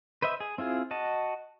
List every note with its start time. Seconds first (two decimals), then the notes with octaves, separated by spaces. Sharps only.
0.22 B4 C5 D#5 E5
0.40 G#4
0.58 C4 E4 F4 G#4
0.91 F#4 D#5 A5